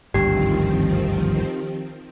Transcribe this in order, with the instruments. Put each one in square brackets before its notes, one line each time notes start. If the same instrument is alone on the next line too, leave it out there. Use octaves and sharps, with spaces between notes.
[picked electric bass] G#1 D2 G2 [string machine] D#3 F3 C4 [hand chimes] G4